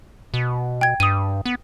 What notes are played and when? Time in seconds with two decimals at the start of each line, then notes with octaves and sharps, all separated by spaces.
0.34 B2
0.81 G5 G#6
1.00 G2 D#6 D#7
1.46 B3